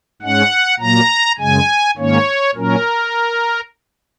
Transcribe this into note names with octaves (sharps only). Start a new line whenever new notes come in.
G#2 G#3 C#4 F#5
A#2 F#3 A#3 A#5
F#2 C#3 G#3 G#5
G#2 D#3 A#3 C#4 C#5
A#2 F#3 C#4 A#4